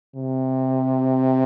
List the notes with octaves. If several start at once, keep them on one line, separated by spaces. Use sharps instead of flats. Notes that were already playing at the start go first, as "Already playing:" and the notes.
C3